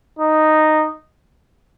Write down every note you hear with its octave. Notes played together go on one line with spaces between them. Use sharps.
D#4